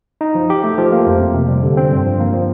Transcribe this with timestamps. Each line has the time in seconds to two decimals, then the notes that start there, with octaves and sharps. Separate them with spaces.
0.21 D#4
0.35 F3
0.50 G4
0.64 A3
0.78 F3
0.92 A#3
1.06 F2
1.21 F2
1.34 C3
1.48 G3
1.63 D3
1.77 C4
1.91 G2
2.06 F3
2.20 A#3
2.34 F3